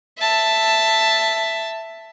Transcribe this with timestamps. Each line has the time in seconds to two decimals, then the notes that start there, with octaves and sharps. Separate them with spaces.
0.19 E5 A5